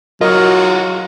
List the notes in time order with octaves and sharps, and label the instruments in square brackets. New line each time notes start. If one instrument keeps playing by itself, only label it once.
[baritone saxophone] F#3 [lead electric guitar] F4 F#4 [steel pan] A#4 [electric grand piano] D#5